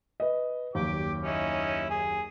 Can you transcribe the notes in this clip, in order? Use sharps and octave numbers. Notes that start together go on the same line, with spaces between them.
B4 D#5
F#1 D#2 G4 D6
C#4 D#4 E4
G#4